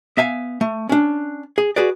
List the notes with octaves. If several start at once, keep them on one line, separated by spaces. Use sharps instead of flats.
B3 E5 F5 G#5
A3
C#4 D4
G#4
F#4 G#4 B4 D5